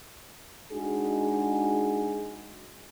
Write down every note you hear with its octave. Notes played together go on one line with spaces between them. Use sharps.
G#3 D4 D#4 F#4 G#4